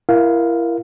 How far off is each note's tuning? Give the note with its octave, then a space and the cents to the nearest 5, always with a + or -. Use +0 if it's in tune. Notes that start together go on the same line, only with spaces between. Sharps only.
E4 +30 A#4 +10 F5 +10